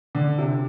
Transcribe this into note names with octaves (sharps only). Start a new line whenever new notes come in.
D3
C3